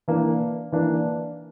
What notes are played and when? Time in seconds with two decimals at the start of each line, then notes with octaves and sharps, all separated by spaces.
0.08 E3 A#3 D4
0.72 E3 A#3 D4